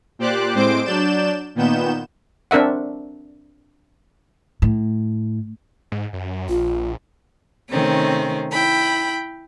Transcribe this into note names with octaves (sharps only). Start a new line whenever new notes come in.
A#2 G4 C5 D5 D6 F#6
A2 G#3 C4 C5 D6 D7
F#3 D4 D5 G6 E7
A#2 D#3 B3 G6 E7
C4 D4 A#4 E5 F#5
A2
G#2
F#2
A#1 F4
C3 D#3 A3 C4 C#4
E4 G5 B5